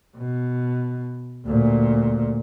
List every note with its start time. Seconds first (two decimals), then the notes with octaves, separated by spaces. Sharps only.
0.17 B2
1.46 D2 A#2